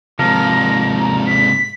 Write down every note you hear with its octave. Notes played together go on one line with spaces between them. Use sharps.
G#2 C3 F3 A#4 A#6
A#5
B6